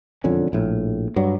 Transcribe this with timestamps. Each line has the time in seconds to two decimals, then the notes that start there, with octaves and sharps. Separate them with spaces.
0.24 E1 F2 D3 C#4
0.53 A#1 A2
1.16 G2 F#3